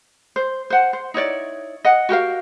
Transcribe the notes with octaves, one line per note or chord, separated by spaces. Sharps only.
C5
C5 F#5
C5
D#4 E4 C#5 D5
D#5 F#5
F#4 G4 A#4 F5